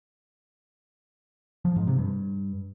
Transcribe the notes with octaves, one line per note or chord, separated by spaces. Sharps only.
F3
G#2
C3
G2